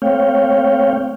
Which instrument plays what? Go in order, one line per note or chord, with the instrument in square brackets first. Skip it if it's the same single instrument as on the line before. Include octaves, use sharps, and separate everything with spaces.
[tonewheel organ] A3 C4 C#5 F5 G5